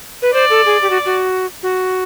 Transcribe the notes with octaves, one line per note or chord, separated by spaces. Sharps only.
B4
C5 D5
A4
G#4
G4
F#4
F#4
F#4